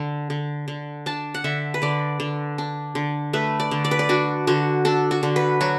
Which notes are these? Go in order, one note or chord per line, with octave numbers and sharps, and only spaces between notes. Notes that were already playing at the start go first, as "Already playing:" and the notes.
Already playing: D3
D3
D3
D4 A5
F#5
D3 E5
B4
D3 D5
D3
D4
D3
A3 B4
D5
D3
D5
B4
D5
D4 F#4
D3 F#4
D4 A4
F#4
D3
B4
F#3 F#4